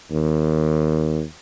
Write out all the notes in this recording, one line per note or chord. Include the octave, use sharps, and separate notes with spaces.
D#2